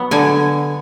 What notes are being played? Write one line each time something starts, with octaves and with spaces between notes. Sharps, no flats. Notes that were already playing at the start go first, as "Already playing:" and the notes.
Already playing: F#3 B3
D3 G#5